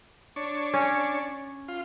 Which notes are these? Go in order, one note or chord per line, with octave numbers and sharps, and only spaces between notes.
D4 C#5
C#4
F4